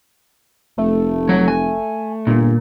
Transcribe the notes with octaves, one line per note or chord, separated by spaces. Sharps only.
F1 A3
F#3 C#5
G#5
G1 A#2